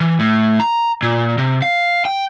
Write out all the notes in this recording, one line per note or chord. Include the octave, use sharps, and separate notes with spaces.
E3
A2
A#5
A#2
C3
F5
G5